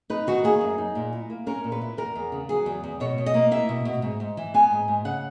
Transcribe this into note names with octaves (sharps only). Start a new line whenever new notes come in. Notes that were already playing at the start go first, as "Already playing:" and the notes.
D#4 B4
D#3 F#4
A#3 G#4
F#2
D#4
A#2
E4
A#3
C#4 A#4
A#2
B4
E4
E2 A#4
E2
C#3
F#3 G#4
E2
E2
B2 C#5
B2
D#5
A#3
E4 E5
B2
B2
G#2
G#2
E3
B3 G#5
G#2
G#2
C#3 F#5